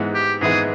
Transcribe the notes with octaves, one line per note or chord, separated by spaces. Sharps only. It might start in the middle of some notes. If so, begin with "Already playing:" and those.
Already playing: G#2 E3 G#3 B3
G4
G#2 E3 G#3 B3 G#4